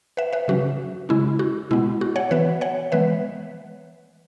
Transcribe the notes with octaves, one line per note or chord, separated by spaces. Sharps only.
B4 E5
B4 E5
C#3 F#3 C#4 F#4 B4
C#3 G#3 C#4 E4
F#4
B2 G#3 B3 E4
F#4
C#5 F#5
E3 B3 B4 E5
C#5 F#5
E3 G#3 B3 B4 E5